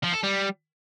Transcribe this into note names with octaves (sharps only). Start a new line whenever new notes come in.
F3
A4
G3